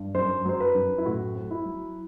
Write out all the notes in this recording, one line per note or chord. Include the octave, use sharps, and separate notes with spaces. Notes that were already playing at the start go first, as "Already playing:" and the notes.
Already playing: G2
F#2 C5
F#3 C5
B4
F#2
E4
A2 F#4
C4
E4
F#3